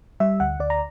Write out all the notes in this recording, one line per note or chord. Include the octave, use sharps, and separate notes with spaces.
G3 E5
D2 F#5
D2 D5
A#5